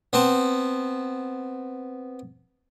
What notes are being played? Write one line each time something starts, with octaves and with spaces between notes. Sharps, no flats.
B3 C4 A5